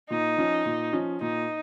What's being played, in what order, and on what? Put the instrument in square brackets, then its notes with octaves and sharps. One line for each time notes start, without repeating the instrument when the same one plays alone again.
[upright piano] A#2 [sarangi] D#4
[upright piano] F3 C#4
A#2
F3 C#4
[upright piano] A#2 [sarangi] D#4